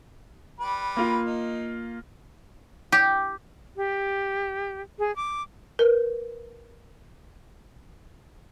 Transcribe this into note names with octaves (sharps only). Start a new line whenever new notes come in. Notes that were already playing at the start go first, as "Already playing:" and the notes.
G3 B4
A#3 F4
D#4
G4
G4
G#4
D6
A#4 B4